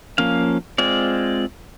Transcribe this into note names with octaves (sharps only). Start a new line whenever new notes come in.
F3 A#3 C#4 F5
G#3 C4 F4 D5